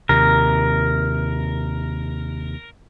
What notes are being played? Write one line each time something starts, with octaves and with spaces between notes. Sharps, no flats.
D#2 C3 A#4